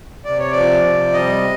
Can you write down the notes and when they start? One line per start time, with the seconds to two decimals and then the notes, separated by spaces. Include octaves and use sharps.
0.25 C3 D5
0.39 C#5
0.52 F3 D5
0.85 C3
1.13 G3 D#5